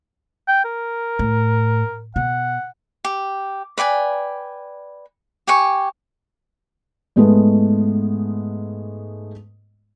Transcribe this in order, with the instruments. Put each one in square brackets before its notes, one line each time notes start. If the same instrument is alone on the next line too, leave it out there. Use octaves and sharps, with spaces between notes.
[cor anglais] G5
A#4
[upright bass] A2
[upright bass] B2 [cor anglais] F#5
[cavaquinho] G4
B4 D5 G5 G#5
G4 G5 G#5 C#6
[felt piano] G#2 G#3 A3 B3